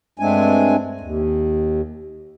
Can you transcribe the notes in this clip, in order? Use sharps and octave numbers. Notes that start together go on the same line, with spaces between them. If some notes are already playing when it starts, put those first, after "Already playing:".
G2 G#3 A3 C4 D4 G#5
D#2